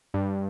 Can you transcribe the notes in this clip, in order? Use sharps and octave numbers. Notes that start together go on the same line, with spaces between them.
G2